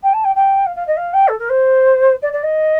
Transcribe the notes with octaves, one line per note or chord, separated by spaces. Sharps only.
G5
A5
G5
G5
F5
F5
D#5
F5
G5
A4
A#4
C5
D5
D5
D#5